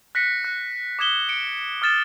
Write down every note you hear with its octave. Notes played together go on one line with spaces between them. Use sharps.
F#6 A#6 B6 C#7
F#6
D6 D#6 G#6 E7 G7
C#7 D7
D#6 F6 A6 E7